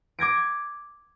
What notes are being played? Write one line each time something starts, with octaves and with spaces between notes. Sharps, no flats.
D6 G#6 A#6 D7